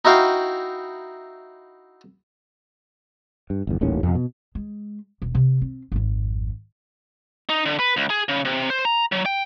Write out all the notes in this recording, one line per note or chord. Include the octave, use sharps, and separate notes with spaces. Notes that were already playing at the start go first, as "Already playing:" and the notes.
D#4 E4 F#4 F5 G5
G2
G1 E2
D#1 A1 D#2 C#4
F2 C3
B2
G#3
E1
C3
C4
G#1 F2
D#4
D3
B4
C#2
G#4
C#3
C3
C5
A#5
F#3
G5